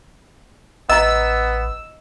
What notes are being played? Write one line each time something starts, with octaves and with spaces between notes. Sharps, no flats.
A1 B3 D#5 A#5 E6